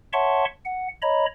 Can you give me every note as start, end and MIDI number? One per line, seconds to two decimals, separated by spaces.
0.13 0.45 73
0.13 0.45 76
0.13 0.45 78
0.13 0.45 81
0.13 0.45 84
0.13 0.45 85
0.65 0.88 78
1.02 1.26 73
1.02 1.26 75
1.02 1.26 82
1.02 1.26 83